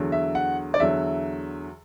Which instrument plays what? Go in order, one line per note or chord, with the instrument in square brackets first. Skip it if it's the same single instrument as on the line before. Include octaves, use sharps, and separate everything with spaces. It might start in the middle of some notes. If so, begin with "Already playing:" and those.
Already playing: [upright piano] E2 D3 F#3
E5
F#5
D5
E2 D3 F#3 E5